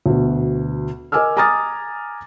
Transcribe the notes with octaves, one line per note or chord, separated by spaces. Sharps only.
D2 B2
A#4 D#5 G#5 D6 E6 F6
G#5 A#5 D6 D#6 F6 A6